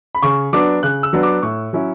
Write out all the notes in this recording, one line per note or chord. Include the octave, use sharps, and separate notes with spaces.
B5
C#3 C#6
F#3 B3 D4 D6
C#3 F#6
E6
F#3 B3 D4
D6
A2 C#6
F#3 C#4 E4